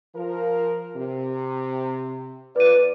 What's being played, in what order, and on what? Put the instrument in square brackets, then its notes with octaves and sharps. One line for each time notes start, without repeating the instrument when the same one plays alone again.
[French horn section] F3 A#4
C3
[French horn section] F2 D5 [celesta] B4 D#7